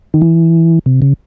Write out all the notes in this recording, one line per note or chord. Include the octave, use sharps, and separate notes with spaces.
D#3
E3
C3
C#3